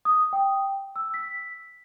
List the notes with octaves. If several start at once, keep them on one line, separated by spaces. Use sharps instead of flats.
D#6
G5
E6
B6